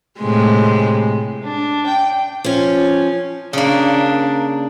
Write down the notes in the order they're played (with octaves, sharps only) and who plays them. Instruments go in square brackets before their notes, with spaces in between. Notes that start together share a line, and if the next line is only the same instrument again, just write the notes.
[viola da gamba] A2 C3 G#3
[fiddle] D4
G5
[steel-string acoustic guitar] F3 C#4
[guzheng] C#3 A#3 [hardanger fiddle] D4